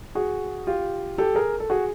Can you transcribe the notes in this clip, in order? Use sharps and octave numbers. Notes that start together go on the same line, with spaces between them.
F#4 G#4
F4 G4
G4 A4
G#4 A#4
A4
F#4 G#4